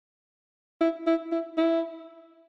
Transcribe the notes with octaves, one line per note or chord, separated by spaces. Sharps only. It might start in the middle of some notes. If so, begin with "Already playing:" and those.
E4
E4
E4
E4